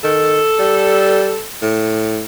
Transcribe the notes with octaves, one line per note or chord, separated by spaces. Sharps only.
D#3 A4
G3
A2